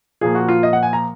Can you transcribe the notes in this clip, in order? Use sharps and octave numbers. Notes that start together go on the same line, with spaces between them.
A#2 F3 A#3 G#4
F#4
F4
D#5
F#5
G#5
A#5